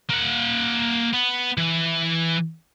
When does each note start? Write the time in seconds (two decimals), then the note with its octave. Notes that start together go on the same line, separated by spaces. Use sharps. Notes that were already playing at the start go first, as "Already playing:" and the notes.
0.10 A#3 F#5
1.13 B3
1.58 E3